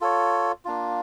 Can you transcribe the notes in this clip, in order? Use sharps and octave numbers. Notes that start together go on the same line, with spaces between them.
F4 A4 C#5
A#3 D4 F4